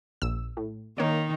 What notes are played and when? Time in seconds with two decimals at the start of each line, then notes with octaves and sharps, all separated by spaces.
0.22 A#1 E6
0.57 A2
0.98 D#3 A#3 D#4 C#5